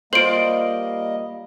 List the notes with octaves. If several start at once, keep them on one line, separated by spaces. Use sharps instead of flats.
G3 A#3 F4 C5 D#5 D7 F#7